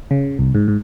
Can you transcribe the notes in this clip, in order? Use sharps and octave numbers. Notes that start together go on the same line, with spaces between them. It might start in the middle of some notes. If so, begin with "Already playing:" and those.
C#3
C2
G#2
G#2